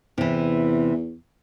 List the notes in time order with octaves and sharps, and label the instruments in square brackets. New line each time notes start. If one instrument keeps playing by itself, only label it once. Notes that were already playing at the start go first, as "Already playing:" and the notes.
[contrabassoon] E2 [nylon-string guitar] C3 E3